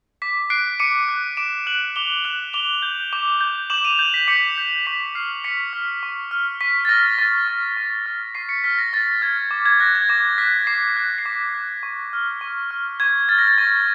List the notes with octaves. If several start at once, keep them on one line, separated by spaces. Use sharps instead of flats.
D6 B6
F#6 C7 D7
D6 C#7 D#7
F#6
D6 D7 E7
F#6 E7 F#7
D6 F7 G7
F#6 E7 F#7
D6 F7 G7
G6
D6
G6
D6 E7 F#7
D#7 F7
G6
B6
D6 B6 C#7
G6
C#6 B6
F6 C7
C#6 B6 C#7
F6
C#6
F6
C#6 B6
A6
F6 A#6
C#6 A6
F6
C#6
F6
C#6 C7
B6 C#7
F6 B6
A#6
C#6 A6
F6 G#6
D6
G#6
F#6 A#6
G#6
D6 A#6
F#6 B6
D6 C7
F#6
C7
D6 B6
F#6
C#6
F6
C#6
F6
C#6 G#6
F6 A6
A#6
A6
C#6 A#6